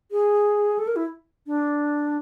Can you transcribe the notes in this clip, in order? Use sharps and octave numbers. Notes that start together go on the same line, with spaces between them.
G#4
A4
A#4
E4
D4